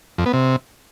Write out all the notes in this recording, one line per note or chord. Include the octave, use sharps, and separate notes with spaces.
F2
B3
C3